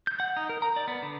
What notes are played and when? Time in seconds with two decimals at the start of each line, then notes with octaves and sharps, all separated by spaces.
0.07 G6
0.20 F#5
0.37 D#4
0.49 A#4
0.62 A#5
0.76 D5
0.88 B3
1.02 D3